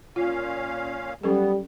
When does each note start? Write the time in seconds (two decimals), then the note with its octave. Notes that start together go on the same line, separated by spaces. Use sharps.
0.16 A#2 C#4 F4 F5
1.23 F#3 G3 B3 C#4 A4